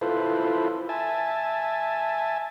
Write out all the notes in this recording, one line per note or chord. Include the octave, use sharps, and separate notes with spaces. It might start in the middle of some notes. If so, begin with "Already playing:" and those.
E4 F4 A4 B4 C5
E5 G#5 A5